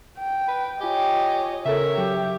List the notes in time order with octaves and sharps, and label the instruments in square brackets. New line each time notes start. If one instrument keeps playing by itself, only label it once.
[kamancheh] G5
[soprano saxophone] B4
[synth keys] F4 G#5 [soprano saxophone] G4 [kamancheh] C#5 D#5
[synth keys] C#3 A4 [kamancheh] A#4 C#5 [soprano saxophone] E5
[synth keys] F#3 [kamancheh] G4